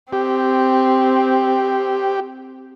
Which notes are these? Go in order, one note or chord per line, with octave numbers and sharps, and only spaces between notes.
C4 G4